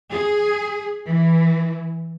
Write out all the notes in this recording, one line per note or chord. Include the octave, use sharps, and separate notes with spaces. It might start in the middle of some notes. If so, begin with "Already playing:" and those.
G#4
E3